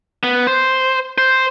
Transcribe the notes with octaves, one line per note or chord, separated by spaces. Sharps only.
B3
C5
C5